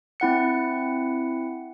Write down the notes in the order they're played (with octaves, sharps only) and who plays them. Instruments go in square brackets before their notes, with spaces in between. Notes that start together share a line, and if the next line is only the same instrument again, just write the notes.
[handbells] C4 E4 F#5 C#7